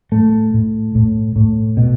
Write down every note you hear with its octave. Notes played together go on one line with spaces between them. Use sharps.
A2 A3
A2
A2
A2
B2